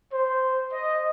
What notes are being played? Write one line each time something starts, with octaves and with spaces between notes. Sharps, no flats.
C5
D#5